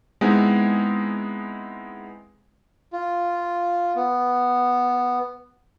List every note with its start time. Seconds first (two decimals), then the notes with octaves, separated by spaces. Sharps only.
0.21 G#3 B3 C4 D#4 E4 G#4
2.93 F4
3.96 B3